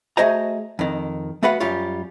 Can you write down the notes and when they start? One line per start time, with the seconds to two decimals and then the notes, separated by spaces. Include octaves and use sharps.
0.17 A3 F#4 G#4 C5 D#5 A#5
0.79 F2 D#3
1.43 A3 B3 F#4 B4 F5 F#5
1.60 F#2 G3 F4 C#5